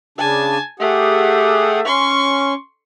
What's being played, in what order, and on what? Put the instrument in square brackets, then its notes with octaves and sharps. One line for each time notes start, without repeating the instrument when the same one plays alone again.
[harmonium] C#3 D4 [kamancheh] G#5 A5
[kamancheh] A3 [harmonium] G4 G#4 F#5
[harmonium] C#4 [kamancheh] C6 C#6